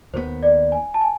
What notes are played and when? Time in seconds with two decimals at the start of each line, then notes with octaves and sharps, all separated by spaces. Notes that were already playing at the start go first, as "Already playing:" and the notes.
0.14 D#2 D#3 F#3 B3 C5
0.43 D5
0.72 G#5
0.94 A5
1.01 G#5